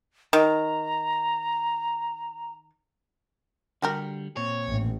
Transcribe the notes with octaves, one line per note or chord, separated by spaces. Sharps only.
D#3 A#5
D3 G3 F#4 G4 A#4
A#2 C4 C#5
A1 A2